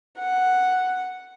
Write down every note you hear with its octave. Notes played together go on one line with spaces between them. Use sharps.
F#5